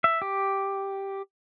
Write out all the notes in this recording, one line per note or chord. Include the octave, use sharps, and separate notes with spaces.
E5
G4